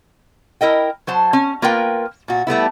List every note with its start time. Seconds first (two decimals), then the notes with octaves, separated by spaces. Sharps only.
0.61 E4 A#4 D#5 G5
1.07 F#3 C5 A5
1.33 C#4
1.62 A#3 F4 A#4 B4 G5
2.28 A#2 F#4
2.47 G3 A3 B3 E4